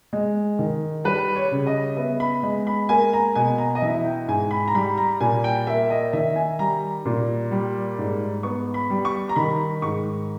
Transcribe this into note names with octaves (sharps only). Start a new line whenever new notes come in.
G#3
D#3
G3 B4
C#5
C#3
D#5
B3 E5
B5
G#3
B5
A#3 G#5
A#5
B2 G#5
A#5
D#5
E3 E5
E5
G5
G#2 G#5
B5
A#5
G3 B5
A#5
A#2 G#5
G5
A#3 E5
D#5
D#3 E5
G#5
G3 A#5
A#2
G3
G#2
B3 C#6
B5
G3
C#6
A#5
D#3 B5
G#2 C#6